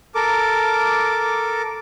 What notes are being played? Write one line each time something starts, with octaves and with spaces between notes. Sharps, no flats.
A4 A#4 D6